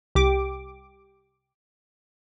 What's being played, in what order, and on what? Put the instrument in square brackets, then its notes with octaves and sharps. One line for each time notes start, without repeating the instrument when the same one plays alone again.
[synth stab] C2 G4 D6